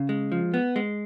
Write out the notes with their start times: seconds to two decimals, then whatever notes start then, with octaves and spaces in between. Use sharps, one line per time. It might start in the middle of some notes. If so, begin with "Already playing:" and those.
Already playing: C#3
0.09 G#3
0.32 F3
0.54 B3
0.76 G#3